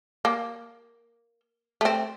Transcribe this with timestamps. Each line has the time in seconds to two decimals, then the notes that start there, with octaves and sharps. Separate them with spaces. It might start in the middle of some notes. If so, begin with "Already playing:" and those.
0.25 A#3
1.81 A3 C4